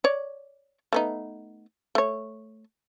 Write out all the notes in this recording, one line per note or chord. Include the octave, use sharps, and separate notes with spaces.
C#5 D5
A3 B3 D#4
A3 C#5